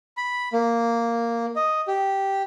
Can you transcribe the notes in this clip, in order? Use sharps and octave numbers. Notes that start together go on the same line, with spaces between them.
B5
A#3
D#5
G4